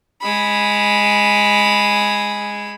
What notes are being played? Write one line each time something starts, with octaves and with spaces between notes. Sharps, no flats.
G#3 B5